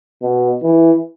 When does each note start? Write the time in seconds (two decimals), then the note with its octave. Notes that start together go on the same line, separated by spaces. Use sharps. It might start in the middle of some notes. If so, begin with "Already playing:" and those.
0.22 B2
0.63 E3